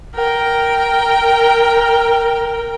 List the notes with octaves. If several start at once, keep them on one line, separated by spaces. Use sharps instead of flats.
A#4 G5